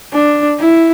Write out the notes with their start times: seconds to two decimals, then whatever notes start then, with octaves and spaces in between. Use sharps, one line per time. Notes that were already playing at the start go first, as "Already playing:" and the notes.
0.13 D4
0.59 E4